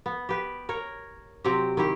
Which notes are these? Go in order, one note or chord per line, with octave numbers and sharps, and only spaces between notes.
B3
G4 B4
A#4 C#5
C3 F#3 C4 G4
D#3 E4 G4